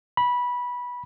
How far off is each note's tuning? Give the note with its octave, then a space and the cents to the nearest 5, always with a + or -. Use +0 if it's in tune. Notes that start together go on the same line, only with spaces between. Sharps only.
B5 -15